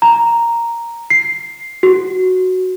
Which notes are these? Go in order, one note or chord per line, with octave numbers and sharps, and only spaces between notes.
A#5
C7
F#4